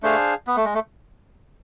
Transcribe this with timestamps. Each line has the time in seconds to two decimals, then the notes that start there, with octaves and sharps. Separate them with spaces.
0.03 A3 D4 G#4 C5 F5
0.47 B3
0.56 A3
0.65 G#3
0.74 A3